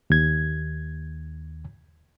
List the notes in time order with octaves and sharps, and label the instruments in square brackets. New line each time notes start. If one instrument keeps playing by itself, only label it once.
[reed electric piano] D#2 G#6